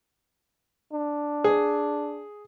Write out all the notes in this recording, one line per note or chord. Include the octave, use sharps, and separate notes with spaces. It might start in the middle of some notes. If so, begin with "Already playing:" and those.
D4
G#4